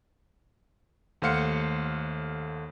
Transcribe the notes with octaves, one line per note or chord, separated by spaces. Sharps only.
D#2 A3 C5 F5 F#5 C#7